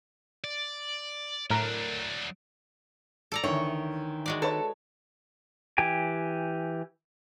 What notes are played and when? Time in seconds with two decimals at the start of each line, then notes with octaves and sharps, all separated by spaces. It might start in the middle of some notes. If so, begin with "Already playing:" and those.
0.44 D5
1.50 A2 F#3 D4 A#4 B6
3.32 A4 D5 A#5
3.44 D2 D#3 E3 C#5
4.26 G#3 F#4 D5
4.42 A4 B4 C#5
5.78 E3 G4 G5 G#5